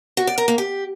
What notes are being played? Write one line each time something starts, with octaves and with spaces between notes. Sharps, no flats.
F#4
D5
A#4
A#3
G4